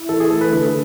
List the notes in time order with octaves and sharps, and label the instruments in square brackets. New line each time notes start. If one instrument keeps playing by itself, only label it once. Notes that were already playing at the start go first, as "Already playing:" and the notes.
Already playing: [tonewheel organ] E4
[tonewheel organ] E3 [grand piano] A4
[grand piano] G#4
[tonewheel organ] A3 [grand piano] A4
[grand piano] B4
[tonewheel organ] D3